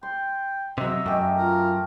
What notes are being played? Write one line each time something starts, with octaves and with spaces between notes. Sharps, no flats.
G5 C6
C3 F#3 D#5 E5
F#2 A3 G4
F4 A#4